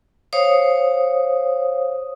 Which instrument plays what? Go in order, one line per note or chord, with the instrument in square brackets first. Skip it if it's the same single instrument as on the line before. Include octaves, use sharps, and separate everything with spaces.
[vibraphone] C5 C#5 F5 D#6